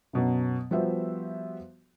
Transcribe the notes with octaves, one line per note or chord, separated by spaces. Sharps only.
F#2 B2 F#3
F3 G3 B3 F#4 C5 E5